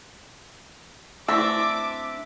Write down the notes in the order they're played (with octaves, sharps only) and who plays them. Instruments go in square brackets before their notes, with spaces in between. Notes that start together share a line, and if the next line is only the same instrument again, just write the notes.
[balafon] A3 E4 [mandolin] C4 D4 E5 [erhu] D6 [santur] E6